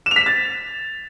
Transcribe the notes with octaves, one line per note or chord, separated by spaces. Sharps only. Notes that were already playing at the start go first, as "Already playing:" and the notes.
E7
F7
B6
F7
A6